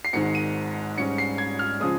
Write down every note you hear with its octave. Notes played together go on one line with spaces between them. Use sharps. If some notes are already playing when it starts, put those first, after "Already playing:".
C7
G#1 G#2 D#3 C#7
D#7
G#2 G3 C#4 C#7
C7
G#6
F6
C#3 F3 G#3 D#6